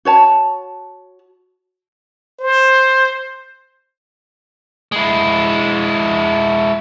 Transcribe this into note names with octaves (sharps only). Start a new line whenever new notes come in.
F#4 C#5 A5
C5
G#3 E4